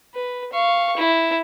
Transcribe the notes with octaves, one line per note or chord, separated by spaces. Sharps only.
B4
F5 C#6
E4